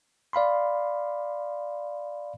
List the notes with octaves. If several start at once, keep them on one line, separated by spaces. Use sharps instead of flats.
D5 F5 B5 C6